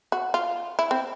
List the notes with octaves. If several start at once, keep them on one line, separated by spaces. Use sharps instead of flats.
F#4
F4
E4
C4